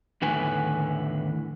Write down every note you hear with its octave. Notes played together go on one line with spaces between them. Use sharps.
E2 A2 D3 D#3 B4 G#5